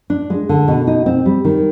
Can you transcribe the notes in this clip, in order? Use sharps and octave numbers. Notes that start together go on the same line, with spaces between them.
D4
G#3
D3
B2
D#4
C4
G3
D#3